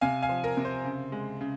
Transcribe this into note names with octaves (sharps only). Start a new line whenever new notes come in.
C3 F5 G#5
F5 G#5
F3
A#4
C3
C5
C#3
G#3
C#3